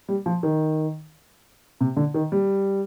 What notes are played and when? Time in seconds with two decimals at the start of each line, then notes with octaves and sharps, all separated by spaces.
0.09 G3
0.26 F3
0.43 D#3
1.81 C3
1.97 D3
2.14 D#3
2.32 G3